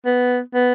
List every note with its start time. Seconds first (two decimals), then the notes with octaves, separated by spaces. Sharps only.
0.06 B3
0.54 B3